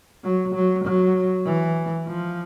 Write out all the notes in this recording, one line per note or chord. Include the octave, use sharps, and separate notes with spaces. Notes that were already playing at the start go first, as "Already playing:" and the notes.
F#3
F#3
F#3
E3
F3